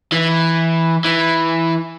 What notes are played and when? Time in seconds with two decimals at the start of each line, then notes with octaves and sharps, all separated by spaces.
0.12 E3
1.05 E3